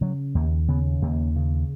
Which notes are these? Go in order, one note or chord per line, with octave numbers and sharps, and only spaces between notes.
C#3 F#3
D#2 A#3
C#3 B3
D#2 A#3
C#3